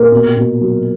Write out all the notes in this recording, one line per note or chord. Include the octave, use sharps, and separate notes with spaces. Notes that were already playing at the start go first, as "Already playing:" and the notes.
Already playing: A#2 A#4
B2
B2
F#3